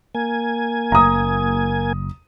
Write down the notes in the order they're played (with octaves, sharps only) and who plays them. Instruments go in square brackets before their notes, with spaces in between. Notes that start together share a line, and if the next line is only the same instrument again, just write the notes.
[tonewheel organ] A#3 G#5
[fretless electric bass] F#1 [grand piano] A#5 D#6